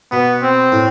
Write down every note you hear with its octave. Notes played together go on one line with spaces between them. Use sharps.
B2 B3
C4
A2